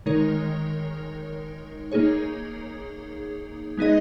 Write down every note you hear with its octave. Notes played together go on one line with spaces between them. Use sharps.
D#3 G#3 D#4 A#4 C#5
A#3 D#4 G#4 C#5
G#3 B3 D#4 G#4 D#5